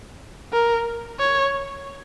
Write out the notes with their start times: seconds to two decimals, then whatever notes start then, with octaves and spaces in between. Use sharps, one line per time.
0.53 A#4
1.19 C#5